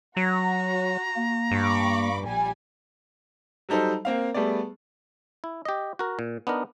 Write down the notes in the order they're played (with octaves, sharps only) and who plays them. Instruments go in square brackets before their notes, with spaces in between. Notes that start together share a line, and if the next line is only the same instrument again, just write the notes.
[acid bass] F#3 [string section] F#4 [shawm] A#5
[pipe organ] A#3
[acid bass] G2 [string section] B5 C#6 D6
[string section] A#1 G3 G#5
[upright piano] F#3 G3 D#4 A4 C5
A#3 C4 F5
G3 A3 B3 G#4 D5
[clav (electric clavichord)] E4
G4 D#5
F#4 A#4
A#2
B3 D4 D#4 A#4